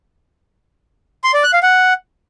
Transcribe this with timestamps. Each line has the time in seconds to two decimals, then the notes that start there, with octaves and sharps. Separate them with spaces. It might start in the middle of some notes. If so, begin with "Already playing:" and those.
1.24 C6
1.34 D5
1.43 F#6
1.53 F5
1.63 F#5